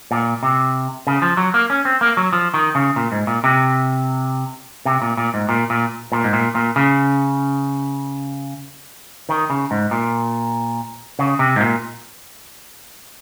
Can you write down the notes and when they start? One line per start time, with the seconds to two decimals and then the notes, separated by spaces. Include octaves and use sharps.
0.11 A#2
0.43 C3
1.07 C#3
1.22 F3
1.37 F#3
1.54 A#3
1.70 C#4
1.85 C4
2.01 A#3
2.17 F#3
2.33 F3
2.54 D#3
2.75 C#3
2.96 A#2
3.12 G#2
3.27 A#2
3.44 C3
4.85 C3
5.02 A#2
5.17 A#2
5.34 G#2
5.49 A#2
5.70 A#2
6.12 A#2
6.24 G#2
6.33 A#2
6.55 A#2
6.76 C#3
9.29 D#3
9.50 C#3
9.71 G#2
9.91 A#2
11.19 C#3
11.39 C3
11.56 G#2
11.60 A#2